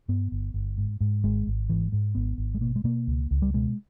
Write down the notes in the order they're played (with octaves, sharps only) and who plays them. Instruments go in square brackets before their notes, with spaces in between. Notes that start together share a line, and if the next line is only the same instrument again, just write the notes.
[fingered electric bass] G2 B3
G1
G1
G#2
G#2
G#1 G#3
G#1
G#2 E3
G#2 G#3
G#1 B3
G#1
G#3
B2 A#3
G#3
B2 A#3
C#2
C#2
G3
B2 G#3